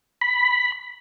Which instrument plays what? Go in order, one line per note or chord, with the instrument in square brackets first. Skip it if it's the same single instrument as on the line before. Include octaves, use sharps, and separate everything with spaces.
[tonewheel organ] B5